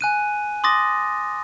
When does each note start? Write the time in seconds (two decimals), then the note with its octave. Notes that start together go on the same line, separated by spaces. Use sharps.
0.01 G#5 F#6 D#7
0.64 C6 D6 D#6 A6 A#6